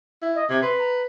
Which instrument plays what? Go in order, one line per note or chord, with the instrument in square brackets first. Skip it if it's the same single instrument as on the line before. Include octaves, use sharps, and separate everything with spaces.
[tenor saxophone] E4
[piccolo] D#5
[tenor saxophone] C3 [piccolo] G#6
[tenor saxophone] B4 [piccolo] C6
[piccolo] A#5